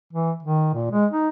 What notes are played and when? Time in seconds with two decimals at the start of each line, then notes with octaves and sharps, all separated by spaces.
0.13 E3
0.43 D#3
0.74 A#2
0.92 G#3
1.11 D#4